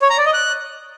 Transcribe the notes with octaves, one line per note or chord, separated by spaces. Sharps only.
C#5
A#5
D5
D#5
F#6